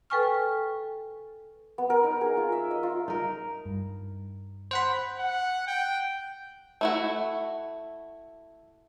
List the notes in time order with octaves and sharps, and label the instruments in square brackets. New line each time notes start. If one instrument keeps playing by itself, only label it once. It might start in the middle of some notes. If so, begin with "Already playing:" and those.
[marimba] A4 B4 G5 G#5 C#6 F6
[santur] B3
A#4
D#4
G#4
F4
E5
D#5
F4
[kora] D#4 A#4
[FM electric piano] G2
[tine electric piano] C5 F#5 B5
[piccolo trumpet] F#5
G5
[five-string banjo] A3 E4 F#4